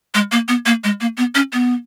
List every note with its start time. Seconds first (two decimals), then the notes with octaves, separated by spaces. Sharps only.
0.14 G#3
0.32 A#3
0.48 B3
0.66 A#3
0.84 G#3
1.01 A#3
1.17 B3
1.35 C#4
1.53 B3